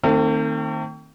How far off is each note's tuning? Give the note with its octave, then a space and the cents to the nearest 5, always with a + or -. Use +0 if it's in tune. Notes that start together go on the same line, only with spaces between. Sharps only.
D#3 +0 A3 +45 C4 +15